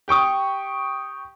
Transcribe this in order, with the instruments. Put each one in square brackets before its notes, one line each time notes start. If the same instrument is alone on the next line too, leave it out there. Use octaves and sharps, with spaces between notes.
[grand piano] G4 G5 C#6 D#6